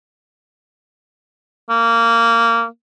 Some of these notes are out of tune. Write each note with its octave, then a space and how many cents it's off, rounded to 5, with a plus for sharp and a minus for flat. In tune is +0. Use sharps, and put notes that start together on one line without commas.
A#3 -15